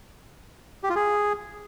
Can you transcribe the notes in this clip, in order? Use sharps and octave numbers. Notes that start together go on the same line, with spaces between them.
G4
F4
G#4